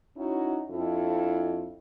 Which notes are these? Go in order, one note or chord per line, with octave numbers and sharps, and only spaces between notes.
C#4 D#4 E4 F#4
F2 D4 E4 A4